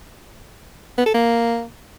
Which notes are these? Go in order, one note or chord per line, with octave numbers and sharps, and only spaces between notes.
B3
A4
A#3